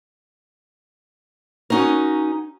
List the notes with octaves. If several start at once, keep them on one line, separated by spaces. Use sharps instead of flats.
C#4 D#4 F#4 A#4